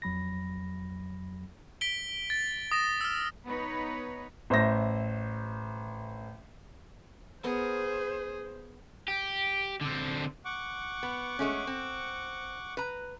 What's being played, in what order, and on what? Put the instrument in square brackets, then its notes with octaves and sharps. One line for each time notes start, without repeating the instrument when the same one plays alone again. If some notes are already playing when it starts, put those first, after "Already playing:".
[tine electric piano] F2 F#3 B5 A#6
[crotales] B6 D7 G7
A6
D#6 A#6 E7
E6 F6
[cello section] B3 D#4 B4 C#5
[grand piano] A1 C5 E5 A#6
[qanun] B3 A#4 [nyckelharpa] G#4 [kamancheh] C5
[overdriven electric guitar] G4
D3 C4
[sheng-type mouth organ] F#5 C#6 D6
[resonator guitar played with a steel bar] B3
G#3 A3 C#4
C4
B4 A#5